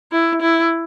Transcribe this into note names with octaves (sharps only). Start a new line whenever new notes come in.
E4
E4